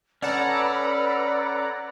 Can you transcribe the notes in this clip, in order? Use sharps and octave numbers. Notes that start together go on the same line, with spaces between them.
C#4 A4 B4 D5 F#5 A#5 B5 E6